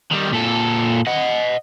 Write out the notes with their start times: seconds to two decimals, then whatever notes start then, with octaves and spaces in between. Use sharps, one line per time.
0.11 D#3 G3
0.32 A#2 A4
1.07 D#5 F#5